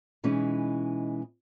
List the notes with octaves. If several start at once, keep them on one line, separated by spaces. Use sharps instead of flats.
B2 E3 G#3 C#4 D#4